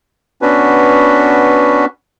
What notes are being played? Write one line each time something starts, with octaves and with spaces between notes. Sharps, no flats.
B3 C#4 D4 F#4 B4